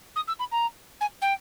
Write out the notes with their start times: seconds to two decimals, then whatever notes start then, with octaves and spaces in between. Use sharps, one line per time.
0.16 D#6
0.28 E6
0.39 B5
0.52 A#5
1.01 G#5
1.22 G5